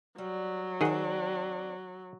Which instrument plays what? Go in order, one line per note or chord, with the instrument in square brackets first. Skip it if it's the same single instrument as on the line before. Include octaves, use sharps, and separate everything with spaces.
[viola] F#3 [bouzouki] G3
[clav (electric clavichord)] D#3 G#4 F#5 [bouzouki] C4 D4